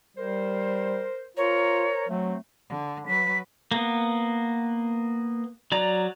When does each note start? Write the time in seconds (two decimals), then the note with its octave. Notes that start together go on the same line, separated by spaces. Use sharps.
0.17 G3 A#4 C5
1.37 F4 A#4 C5 C#5 A#5
2.09 F#3 A3 C4
2.69 D3
3.08 F#3 B4 B6
3.71 A#3 B3
5.72 F#3 D5 A#5